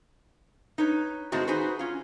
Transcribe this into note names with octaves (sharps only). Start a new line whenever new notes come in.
D#4 B4 C#5
A2 D#3 G#3 A3 C4 F#4
D#4 F#4 G#4 B4 C5
C#4 F4